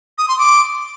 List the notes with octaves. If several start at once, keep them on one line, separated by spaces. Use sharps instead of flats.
D#6
C6
D6